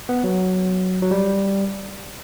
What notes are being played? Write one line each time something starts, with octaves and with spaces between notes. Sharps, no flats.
B3
F#3
F#3
G3